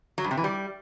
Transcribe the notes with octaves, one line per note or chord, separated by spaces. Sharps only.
F#3
G2
C3
E3
G3